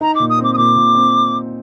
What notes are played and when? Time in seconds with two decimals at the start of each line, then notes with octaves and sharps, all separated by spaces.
0.01 D#4 A#5
0.15 A#2 D6
0.29 D#6
0.39 C4 D6
0.53 D#6
0.58 A#2 D6
0.76 A#2
0.95 C4